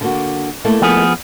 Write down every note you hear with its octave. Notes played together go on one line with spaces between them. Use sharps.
D3 A#3 F#4
A3 A#3 E4
F3 B3 G#4